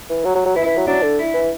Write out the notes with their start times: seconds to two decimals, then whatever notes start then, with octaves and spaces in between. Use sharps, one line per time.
0.10 E3
0.25 F#3
0.35 F#3
0.45 F#3
0.55 E3 E4
0.66 E3
0.77 F#3
0.87 F#3 D4
1.02 D3
1.18 E4
1.33 E3